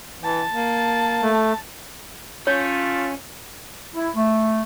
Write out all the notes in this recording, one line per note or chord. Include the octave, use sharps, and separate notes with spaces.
E3 A5
A#3
A3
A3 C#4 F4 C#5
E4
A3